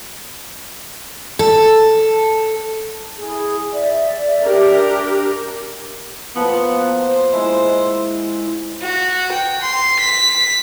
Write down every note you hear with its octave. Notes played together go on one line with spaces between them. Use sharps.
A4
E4 G#4
D5 E5
D4 G4 A#4
F3 A#3 B3
C5
G#3 E4
F#4
G5
C6
B6